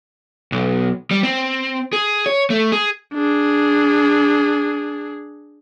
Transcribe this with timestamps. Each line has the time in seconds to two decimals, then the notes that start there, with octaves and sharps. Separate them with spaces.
0.52 B1
1.11 G3
1.23 C4
1.93 G#4
2.26 C#5
2.50 A3
2.72 G#4
3.14 D4 G#4